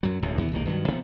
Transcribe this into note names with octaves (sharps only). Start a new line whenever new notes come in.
F#2 F#3
D1 C#2 A2
D#2 E3 A#3 B3
E1 C2 D#3 A#3
G2 D#3 E3 F#3
C3 F3 A3 B3